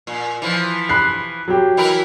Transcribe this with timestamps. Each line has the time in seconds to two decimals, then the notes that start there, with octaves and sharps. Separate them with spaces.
0.07 A#2
0.42 E3 F3
0.89 B5 F#6 C7
1.48 F#3 G4
1.77 E3 E4 A#4